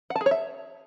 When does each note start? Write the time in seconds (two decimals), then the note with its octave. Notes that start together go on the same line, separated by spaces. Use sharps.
0.10 F#5
0.16 A5
0.21 G#4
0.26 C#5
0.31 E5